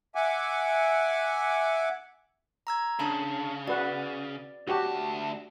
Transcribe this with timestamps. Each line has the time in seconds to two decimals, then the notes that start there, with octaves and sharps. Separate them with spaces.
0.15 E5 F#5 G#5 D6
2.67 A#5 E6 G#6
2.99 C#3 D4 A5 B5
3.68 F#4 B4 D5 F#5
4.68 D2 F#4 G4 A5